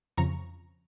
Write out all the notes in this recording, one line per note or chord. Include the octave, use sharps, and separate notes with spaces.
F2 C#3 F3 A#5 C#6